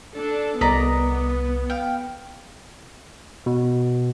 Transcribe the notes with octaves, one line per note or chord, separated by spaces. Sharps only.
D4 A4
C2 B3 D5 D#5 A#5 D#6 B6
F5 G5
B2